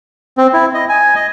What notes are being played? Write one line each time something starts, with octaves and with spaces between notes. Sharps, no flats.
C4
E4
D#5
G#5
D#5